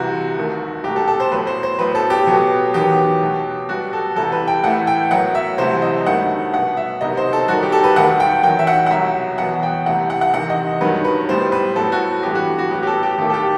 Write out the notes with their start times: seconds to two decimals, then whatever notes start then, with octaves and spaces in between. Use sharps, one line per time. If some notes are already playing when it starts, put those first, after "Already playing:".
Already playing: C2 C3 E3 F#4
0.37 D#2 D#3 A3
0.84 C2 B2 A3 G4
0.96 A4
1.08 A4
1.20 C5
1.31 A2 F#3 B3 B4
1.47 C5
1.63 C5
1.79 A2 F#3 B3 B4
1.95 A4
2.10 G4
2.27 B2 F#3 B3
2.74 E2 D#3 F#3 B3 G4
3.21 B2 F#3 A3
3.69 B2 G3 B3 F#4
3.93 A4
4.16 C2 C3 E3 G3 A4
4.32 B4
4.48 G5
4.63 A2 E3 A3 F#5
4.87 G5
5.11 F#2 F#3 B3 F#5
5.35 E5
5.58 C2 C3 E3 A3 C5
5.82 D#5
6.06 G2 D#3 F#3 A3 F#5
6.53 B2 F#3 B3 F#5
6.77 E5
7.01 C2 C3 D#3 F#3 B3 D#5
7.17 C5
7.33 A4
7.48 F#2 D#3 G3 F#4
7.63 G4
7.72 A4
7.84 B4
7.96 D#2 D#3 A3 F#5
8.20 G5
8.43 E2 D#3 F#3 G5
8.59 E5
8.67 F#5
8.86 F#5
8.91 C2 B2 F#3 E5
9.38 E2 B2 F#3 B3 F#5
9.63 G5
9.86 C2 C3 E3 A3 F#5
10.10 F#5
10.21 F#5
10.33 E2 C3 D#3 F#5
10.50 D#5
10.81 G2 D#3 F#3 B4
11.04 B4
11.29 A2 G3 B3 C5
11.52 B4
11.76 A2 F#3 B3 A4
11.92 F#4
12.23 G2 E3 B3 G4
12.35 F#4
12.59 F#4
12.71 A2 F#3 B3 G4
12.83 G4
12.87 A4
13.03 G4
13.18 D#2 D#3 A3 G4
13.30 A4
13.34 G4